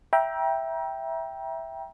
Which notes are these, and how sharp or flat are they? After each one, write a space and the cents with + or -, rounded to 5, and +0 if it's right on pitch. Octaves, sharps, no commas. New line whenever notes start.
E5 +0 G5 +0 A#5 +35